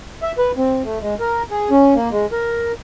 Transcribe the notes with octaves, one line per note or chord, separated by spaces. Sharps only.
E5
B4
C4
A3
G#3
A#4
G#4
C#4
A#3
G#3
A#4